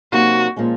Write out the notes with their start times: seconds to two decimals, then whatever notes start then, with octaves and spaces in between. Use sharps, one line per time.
0.12 C3 F#3 A#3 D#4 F#4
0.56 A#2 F3 G#3 C#4